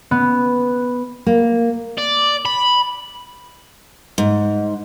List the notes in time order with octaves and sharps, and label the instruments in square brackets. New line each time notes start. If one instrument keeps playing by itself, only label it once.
[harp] B3
[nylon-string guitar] A#3
[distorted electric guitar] D5
B5
[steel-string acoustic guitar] G#2